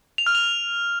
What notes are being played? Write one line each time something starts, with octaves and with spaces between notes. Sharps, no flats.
F7
F6
F7